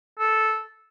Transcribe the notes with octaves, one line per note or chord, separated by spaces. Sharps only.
A4